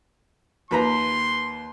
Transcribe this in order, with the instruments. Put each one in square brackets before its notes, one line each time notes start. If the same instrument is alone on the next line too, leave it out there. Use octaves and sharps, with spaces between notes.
[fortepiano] D#2 B4 A#5 [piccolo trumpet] C6